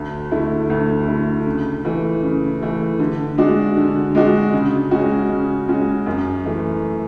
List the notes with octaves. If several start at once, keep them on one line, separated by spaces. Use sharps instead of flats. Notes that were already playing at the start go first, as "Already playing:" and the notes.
Already playing: D2
D3 A3 E4
D2
D3 A3 E4
C#3
E3 A3
C#3
E3 A3
D3
G#3 D4 F#4
D3
G#3 D4 F#4
C#3
G#3 C#4 F#4
C#3
G#3 C#4 F#4
F#2
E3 A3